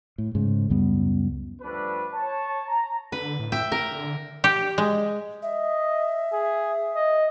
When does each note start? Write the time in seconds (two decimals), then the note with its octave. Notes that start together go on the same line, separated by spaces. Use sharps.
0.18 A2
0.35 G#2 C#3
0.70 C#2 F#2 G3 B3
1.62 F3 G3 A3 D4 B4
2.13 C#5 A5
2.68 A#5
3.12 D3 B4
3.39 A2
3.52 E5 G5
3.72 A2 A#4
3.91 D3
4.44 G4
4.78 G#3
5.42 D#5 E5
6.33 G#4
6.96 D#5